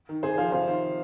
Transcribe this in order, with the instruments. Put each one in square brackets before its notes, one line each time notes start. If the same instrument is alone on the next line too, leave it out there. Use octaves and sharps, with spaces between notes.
[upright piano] D#3
C3 G#4 C5
F3 C5 F5
C3 C5 F5
D#3